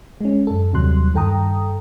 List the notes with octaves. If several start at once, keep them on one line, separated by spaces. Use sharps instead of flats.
G#3 C#4
F#2 A4
D#2 C3 F#3 G3 C6 F#6
G2 D#3 A4 G5 A#5 D#6